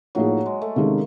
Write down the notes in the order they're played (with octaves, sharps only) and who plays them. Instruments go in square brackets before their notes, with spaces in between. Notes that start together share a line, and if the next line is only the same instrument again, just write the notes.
[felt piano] A2 F3 A#3 D#4 G#4 [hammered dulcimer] F#3
[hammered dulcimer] G#3
A3
[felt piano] C3 D#3 G#3 C#4 [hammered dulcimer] A#3